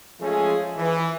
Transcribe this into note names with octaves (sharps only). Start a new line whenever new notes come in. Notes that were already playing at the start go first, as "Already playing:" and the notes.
F3 G#3 A3 C#4 F4 G#4
E3